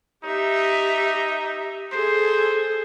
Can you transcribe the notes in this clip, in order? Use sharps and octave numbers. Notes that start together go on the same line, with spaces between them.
D#4 G4 E5
G#4 A4 C5